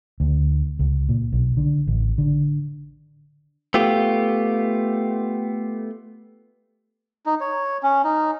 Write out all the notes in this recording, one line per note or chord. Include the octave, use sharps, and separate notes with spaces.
D2
C#2
A#2
B1
D3
A1
D3
A3 B3 F4 G4
D#4
C#5
C#4
D#4